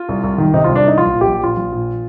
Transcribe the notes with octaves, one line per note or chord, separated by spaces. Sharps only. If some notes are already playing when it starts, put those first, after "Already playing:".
Already playing: F4
C2
C2
D#3
C3 D#4
C2 F4
D4
C2 D#4
A#1 F4
A#2
G4
A#1
A#2 F4
A#1
A#2